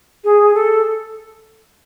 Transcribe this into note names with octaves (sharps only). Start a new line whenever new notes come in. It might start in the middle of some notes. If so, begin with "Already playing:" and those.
G#4
A4